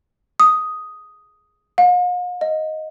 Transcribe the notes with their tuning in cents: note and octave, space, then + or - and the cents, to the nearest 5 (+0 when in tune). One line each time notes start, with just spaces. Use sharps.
D#6 +5
F5 +45
D#5 +5